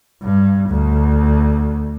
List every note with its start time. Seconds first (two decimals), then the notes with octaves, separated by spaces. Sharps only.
0.22 G2
0.70 D2